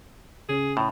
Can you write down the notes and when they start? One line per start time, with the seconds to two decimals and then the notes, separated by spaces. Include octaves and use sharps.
0.49 C#3 C#4 G#4
0.77 A2